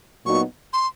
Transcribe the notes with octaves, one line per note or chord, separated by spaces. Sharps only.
A#2 F#3 B3 D#4 F#4 C#6
C6